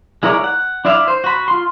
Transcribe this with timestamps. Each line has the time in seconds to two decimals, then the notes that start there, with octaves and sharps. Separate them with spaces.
0.23 G#3 E4 A#4 C#5 D5
0.44 F#5
0.85 D4 E4 D5 E5 F5
1.08 C5
1.24 F#4 B5
1.48 F4 C6